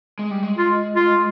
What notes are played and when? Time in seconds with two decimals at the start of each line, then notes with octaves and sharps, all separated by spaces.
0.19 G#3
0.31 G3
0.43 G#3
0.58 F4
0.96 F4